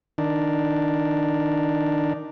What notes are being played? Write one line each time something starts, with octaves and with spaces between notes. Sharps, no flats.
D#3 D4